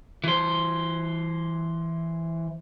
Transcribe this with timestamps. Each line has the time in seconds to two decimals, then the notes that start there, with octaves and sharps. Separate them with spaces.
0.24 E3 C5